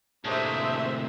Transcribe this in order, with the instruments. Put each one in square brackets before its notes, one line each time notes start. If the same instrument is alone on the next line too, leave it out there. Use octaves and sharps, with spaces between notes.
[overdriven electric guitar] A2 C3 [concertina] A3 D4 G#4 [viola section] A#3 C5 E5